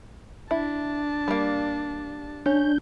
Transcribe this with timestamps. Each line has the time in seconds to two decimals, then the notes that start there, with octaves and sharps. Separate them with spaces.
0.51 D4 E4 A5
1.28 G3 A#3
2.46 C#4 D4 G6